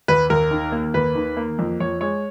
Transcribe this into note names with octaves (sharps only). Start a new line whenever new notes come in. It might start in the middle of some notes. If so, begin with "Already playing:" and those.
D#2 B4
D#2 A#4
D#3
A#3
D#2 B4
D#3
A#3
F2
F2 C#5
G#3 C#5